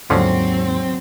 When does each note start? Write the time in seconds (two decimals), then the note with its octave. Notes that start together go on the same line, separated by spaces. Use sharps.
0.10 D#2 G#2 D3 F3 F#3 C4 C#4